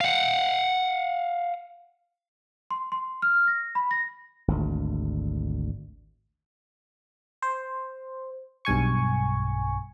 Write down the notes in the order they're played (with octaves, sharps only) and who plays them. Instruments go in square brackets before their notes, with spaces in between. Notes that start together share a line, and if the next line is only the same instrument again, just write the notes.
[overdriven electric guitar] F5 F#5
[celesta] C6
C6
F6
A#6
B5
A#6
[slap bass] G#1 D2
[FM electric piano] C5
B1 G2 G#5 C#6